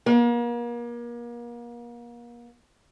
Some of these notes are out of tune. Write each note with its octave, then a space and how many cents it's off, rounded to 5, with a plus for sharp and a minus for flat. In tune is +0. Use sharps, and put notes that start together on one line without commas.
A#3 +35